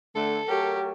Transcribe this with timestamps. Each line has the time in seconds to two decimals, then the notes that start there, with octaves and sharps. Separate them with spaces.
0.16 D3 A3 A4
0.48 F#3 A3 G4 A#4